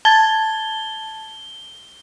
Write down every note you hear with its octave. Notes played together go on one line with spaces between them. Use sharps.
A5 G#6 A6 G7